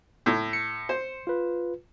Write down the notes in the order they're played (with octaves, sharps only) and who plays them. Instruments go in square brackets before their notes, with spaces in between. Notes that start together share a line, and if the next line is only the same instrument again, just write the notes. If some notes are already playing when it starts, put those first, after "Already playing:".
[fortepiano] A2
[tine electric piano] C#7
[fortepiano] C5
[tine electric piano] F4 B4